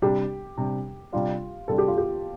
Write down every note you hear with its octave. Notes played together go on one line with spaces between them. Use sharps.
C3 G3 D4 G4
C3 G3 D4
C3 G3 D4 F4
C3 G3 D4 A4
G4
F4
G4